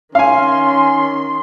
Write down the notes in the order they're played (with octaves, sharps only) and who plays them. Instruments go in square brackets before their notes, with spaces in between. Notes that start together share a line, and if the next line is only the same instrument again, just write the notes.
[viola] D#3 C6 [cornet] C#4 [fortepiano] F5 G#5